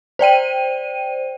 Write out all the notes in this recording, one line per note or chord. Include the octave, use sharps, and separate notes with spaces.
C5 D5 G5 D#7